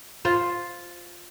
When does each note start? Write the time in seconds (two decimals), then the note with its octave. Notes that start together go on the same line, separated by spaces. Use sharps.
0.25 F4 C5